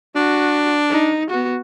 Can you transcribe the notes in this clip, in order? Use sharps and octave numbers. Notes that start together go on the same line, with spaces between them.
D4 F#4
D#4
B3 F#4